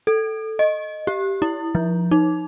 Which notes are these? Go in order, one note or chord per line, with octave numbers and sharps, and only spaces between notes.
A4
D#5
G4
E4
F3
D#4